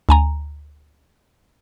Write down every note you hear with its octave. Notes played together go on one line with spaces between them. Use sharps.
D2 G#5 A#5